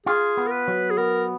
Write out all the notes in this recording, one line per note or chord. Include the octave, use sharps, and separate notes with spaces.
F4 G#4
B3
A#4
B4
F#3
G#4
B3 A#4